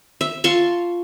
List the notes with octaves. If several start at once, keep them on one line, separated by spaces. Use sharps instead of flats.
E5
F4 A5 C6 C#6